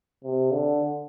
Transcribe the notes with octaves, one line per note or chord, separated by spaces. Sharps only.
C3
D3